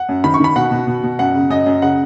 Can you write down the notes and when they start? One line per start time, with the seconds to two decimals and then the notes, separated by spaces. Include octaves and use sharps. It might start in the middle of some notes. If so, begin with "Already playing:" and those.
Already playing: F#5
0.09 F#2
0.24 D#3 B5
0.34 C#6
0.40 D#3 B5
0.56 B2 F#5
0.71 B2
0.87 B2
1.03 B2
1.19 F#2 F#5
1.35 C#3
1.50 F#2 D#5
1.66 F#2
1.82 C#3 F#5